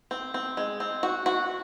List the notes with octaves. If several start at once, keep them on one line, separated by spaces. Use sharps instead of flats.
C4
C4
G#3
C4
F#4
F#4